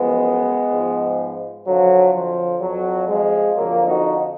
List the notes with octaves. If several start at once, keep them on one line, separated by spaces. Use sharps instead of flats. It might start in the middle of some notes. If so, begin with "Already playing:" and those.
Already playing: F#2 F3 G#3 B3
G#2 F3
F2 D3 F3 F#3
F3
F2 F3 F#3
F3 G#3
F2 D3 F3 F#3 A#3
D#4 F#4